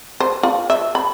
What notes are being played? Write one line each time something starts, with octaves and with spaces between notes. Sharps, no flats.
C5
F4
E5
B5